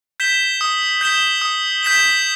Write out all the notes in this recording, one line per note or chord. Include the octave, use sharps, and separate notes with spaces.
G6 B6 E7 G7
D#6
G6 B6 E7 G7
D#6
G6 B6 E7 G7